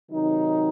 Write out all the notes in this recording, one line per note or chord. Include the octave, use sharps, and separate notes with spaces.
C3 D#3 F#3 D#4